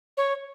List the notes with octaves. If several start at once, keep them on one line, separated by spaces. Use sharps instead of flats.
C#5